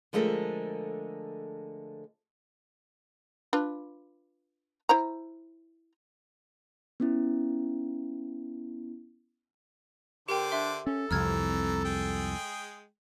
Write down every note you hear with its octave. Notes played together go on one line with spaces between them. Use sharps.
D3 F3 G#3 A3 A4 A#4
D4 F4 B4
E4 C5 A#5
B3 C#4 E4
D3 G4 A#4 C5 G5 D6
D4 E5 C6
C#4 A4
C2 F2 E3 A#5 E6 F6 G#6
G#3 G#4 G5